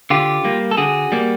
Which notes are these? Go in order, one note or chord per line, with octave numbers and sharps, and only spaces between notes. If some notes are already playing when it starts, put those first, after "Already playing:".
D3 F4 G4
G3 A#3
A4
D3 F#4 G#4
G3 A#3